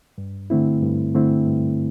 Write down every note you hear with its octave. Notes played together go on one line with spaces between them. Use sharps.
G2
D3 A3 C4 E4
G2
D3 A3 C4 E4
G2